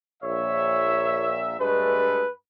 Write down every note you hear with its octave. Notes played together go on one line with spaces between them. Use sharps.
A#1 A#2 C#5 E5
G2 G#3 A3 B4